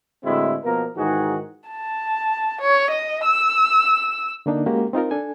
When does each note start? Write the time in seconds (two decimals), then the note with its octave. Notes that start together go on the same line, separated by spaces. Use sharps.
0.24 A2 D3 G#3 C4 E4 F#4
0.65 B2 F3 A#3 B3 A#4
0.97 G#2 D#3 E3 D#4 F#4 G#4
1.69 A5
2.61 C#5
2.90 D#5
3.25 E6
4.46 D3 A#3 D4 D#4
4.66 G#3 A#3 C#4 F#4 G4
4.93 C4 D#4 F4 A#4
5.11 D4 A4 G#5